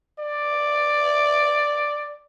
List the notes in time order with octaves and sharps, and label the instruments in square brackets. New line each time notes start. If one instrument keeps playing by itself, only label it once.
[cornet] D5